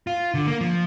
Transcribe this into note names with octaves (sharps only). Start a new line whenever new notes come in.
F4
D3
A#3
F3